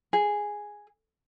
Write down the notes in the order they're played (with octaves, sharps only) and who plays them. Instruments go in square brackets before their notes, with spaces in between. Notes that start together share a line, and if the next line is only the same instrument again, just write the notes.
[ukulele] G#4